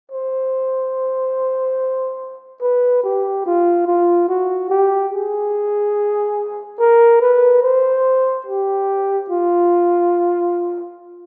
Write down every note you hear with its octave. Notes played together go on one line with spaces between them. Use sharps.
C5
B4
G4
F4
F4
F#4
G4
G#4
A#4
B4
C5
G4
F4